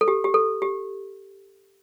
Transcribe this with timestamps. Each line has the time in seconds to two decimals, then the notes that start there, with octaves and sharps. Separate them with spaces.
0.01 A4
0.08 G4
0.24 G4
0.34 A4
0.62 G4